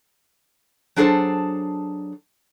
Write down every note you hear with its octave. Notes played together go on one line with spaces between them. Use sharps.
F#3 D4 G#4 A4 C5